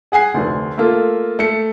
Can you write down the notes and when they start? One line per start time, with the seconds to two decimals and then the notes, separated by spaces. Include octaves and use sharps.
0.12 G#4 F#5 G#5 C7
0.34 F1 D2
0.77 A3 A#3 F4 A4
1.39 A3 C#7